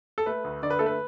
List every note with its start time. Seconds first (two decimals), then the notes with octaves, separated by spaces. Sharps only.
0.18 A4
0.26 A3 B4
0.44 D2
0.63 D3 D5
0.70 B4
0.79 A3 A4
0.86 B4